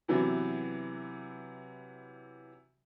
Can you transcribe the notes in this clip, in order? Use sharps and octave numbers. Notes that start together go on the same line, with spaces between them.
C3 E3 F#3 B3